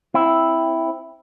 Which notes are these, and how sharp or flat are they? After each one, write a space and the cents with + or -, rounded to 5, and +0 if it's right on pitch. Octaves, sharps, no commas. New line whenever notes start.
C4 +0 E4 +0